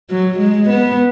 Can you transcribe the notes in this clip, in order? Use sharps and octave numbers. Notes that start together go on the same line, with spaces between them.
F#3
G#3
B3